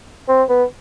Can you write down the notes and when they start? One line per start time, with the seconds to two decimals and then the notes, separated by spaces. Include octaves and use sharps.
0.28 C4
0.49 B3